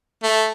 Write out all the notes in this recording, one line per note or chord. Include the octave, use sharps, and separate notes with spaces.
A3